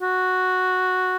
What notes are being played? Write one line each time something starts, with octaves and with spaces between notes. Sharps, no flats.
F#4